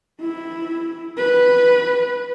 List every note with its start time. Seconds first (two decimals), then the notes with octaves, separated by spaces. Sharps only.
0.21 E4
1.18 B4